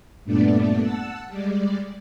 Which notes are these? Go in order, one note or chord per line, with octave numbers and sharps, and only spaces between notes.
G2 A#2 A3 B3 D4 D5
F#5 A5 E6
G3 G#3 D5